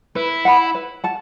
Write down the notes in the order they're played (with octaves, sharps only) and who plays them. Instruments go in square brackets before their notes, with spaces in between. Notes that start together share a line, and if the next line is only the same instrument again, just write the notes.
[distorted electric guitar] E4 [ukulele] B4
[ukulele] F#5 B5
B4
F#5 A5